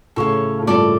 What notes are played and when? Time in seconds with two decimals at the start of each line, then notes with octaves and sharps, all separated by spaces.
0.16 A2 C#3 A4 C#5 F5
0.62 A2
0.67 G2 A#2 A4 D5 A5